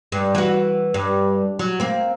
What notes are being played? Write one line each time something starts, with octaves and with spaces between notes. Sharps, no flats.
G2
E3 F#4
G2
F#3
A#3 C4